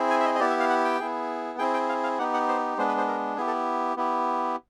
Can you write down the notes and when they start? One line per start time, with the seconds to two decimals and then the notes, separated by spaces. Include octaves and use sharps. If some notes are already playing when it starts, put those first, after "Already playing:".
Already playing: C4 E4 G#4
0.10 G#5
0.21 E5
0.25 D#5
0.35 D#5
0.40 B3 E4 G4 D5
0.50 E5
0.60 F5
0.70 F#5
0.85 G5
1.00 B3 E4 G#4
1.59 C4 E4 G#4 G5
1.74 G5
1.89 F5
2.03 F5
2.19 B3 D#4 G4 F#5
2.34 F#5
2.48 C5
2.78 G#3 B3 D4 C5
2.88 B4
2.98 C5
3.08 A#4
3.37 B3 E4 G4 G#4
3.47 A4
3.97 B3 E4 G4